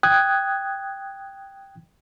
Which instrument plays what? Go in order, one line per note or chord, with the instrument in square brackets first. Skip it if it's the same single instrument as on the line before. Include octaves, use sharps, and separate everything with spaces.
[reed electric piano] G5 D#6 F#6 G#6